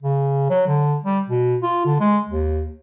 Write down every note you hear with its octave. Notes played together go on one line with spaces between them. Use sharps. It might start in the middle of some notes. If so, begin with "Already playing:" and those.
C#3
F#3
D3
G3
B2
F4
D3
G#3
D#2